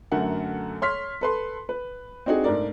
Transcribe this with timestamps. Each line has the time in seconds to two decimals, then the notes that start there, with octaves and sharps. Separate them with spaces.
0.12 F#2 D3 A3 A#4 F#5
0.82 C#5 C6 F6 B6
1.21 A4 B4 C6
1.69 B4
2.26 C4 D4 D#4 F#4 G#4
2.44 G#2 A3 D4 A#4 D5